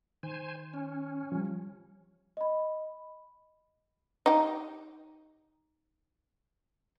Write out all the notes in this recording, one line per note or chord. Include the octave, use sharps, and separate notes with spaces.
D#3 C5 G#5
C#4
F3 G3
D#5 B5
D#4 G4